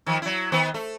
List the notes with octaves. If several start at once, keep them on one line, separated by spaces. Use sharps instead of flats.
D#3 F3
F#3 E4
D#3 B3 C5
A3